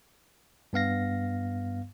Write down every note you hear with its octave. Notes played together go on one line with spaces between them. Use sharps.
G2 B3 F5 A#6